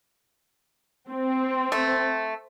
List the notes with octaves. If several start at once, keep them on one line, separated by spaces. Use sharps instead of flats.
C4
A3